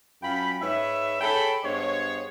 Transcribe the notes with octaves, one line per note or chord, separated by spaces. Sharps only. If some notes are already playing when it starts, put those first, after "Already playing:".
F#2 F4 G5 B5
G#2 B4 C#5 E5
G#4 A4 C#5 G5 A5 B5
G2 G#3 B3 C5 C#5